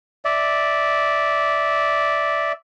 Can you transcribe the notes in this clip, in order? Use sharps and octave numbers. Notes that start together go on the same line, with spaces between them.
D5 E5